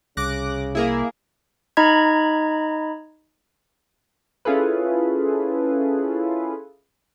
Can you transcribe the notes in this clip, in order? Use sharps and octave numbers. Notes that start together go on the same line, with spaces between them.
C2 C#3 D6 F#6 A#6
A#3 E4 G#4 A#4
D#4 D#5 A#5 B5 G#6
C#4 E4 F4 G#4 A4 B4